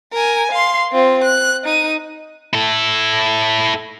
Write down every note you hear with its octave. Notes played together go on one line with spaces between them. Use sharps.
A#4 G#5
F5 C6
C4 F4
F#6
D#4 D#7
E4 A4